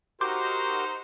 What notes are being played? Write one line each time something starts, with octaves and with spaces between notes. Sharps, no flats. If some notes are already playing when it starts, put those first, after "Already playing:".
D#4 F#4 G4 A#4 C5 C6 D6 G6